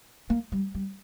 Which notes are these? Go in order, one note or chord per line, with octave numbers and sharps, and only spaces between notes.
A#3
G3
G3